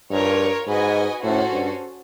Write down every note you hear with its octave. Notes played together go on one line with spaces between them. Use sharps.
G2 F4 A#4 C#5
G#2 F#4 B4 D#5 G#5
A2 C#4 F#4 A4 C5
G2